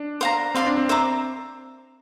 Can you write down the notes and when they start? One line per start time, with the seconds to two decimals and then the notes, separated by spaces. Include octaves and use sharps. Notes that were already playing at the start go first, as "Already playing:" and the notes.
Already playing: D4
0.21 C5 F5 A#5
0.55 C4 D5 F5 C6
0.67 D4
0.77 C4
0.89 C5 E5 A#5 D6